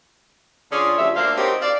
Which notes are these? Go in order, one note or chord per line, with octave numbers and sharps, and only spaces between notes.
D3 C#4 F4 G#4 D5
D2 C#3 F3 G3 E5
D2 A#3 D4 C5 F5
C4 D#4 F#4 G4 A#4 C#5
D5 F5